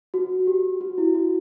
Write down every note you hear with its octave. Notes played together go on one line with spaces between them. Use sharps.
F#4
G4
F#4
E4
F#4